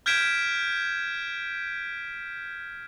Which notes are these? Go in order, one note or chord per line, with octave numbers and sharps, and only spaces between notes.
F6 G6 G#6 B6 D7 E7